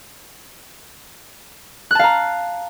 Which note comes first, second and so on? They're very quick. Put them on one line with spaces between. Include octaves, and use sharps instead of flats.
F#6 A5 F5 A#5